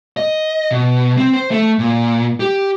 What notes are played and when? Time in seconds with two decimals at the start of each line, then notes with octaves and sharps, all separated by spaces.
0.17 D#5
0.71 B2
1.17 C4
1.33 C5
1.51 A3
1.79 A#2
2.40 G4